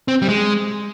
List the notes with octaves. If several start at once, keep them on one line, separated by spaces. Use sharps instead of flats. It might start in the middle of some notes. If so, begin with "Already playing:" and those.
C4
G3
G#3